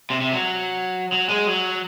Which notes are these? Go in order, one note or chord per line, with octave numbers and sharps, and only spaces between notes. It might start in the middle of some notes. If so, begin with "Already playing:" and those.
C3
C3
F#3
F#3
G#3
F#3